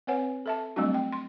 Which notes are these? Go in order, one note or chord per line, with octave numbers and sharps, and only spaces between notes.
C4 B4 C#5 F#5 G#5
A4 E5 A5
F#3 G3 A3 C4 D4 F#4
G5
C6